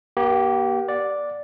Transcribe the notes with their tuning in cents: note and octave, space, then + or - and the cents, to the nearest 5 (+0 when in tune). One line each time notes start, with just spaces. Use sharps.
A#3 +40 G4 -20
D5 +0 F#5 -25